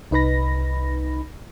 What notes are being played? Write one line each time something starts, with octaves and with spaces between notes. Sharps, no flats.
C2 D#4 B4 B5 A#6